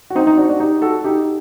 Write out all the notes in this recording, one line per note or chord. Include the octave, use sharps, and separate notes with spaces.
F#4
C4 D#4
C4 D#4
D4 F#4
D4 F#4
D#4 G4
F#4 A4
D#4 G4